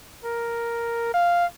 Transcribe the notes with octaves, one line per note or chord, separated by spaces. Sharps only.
A#4
F5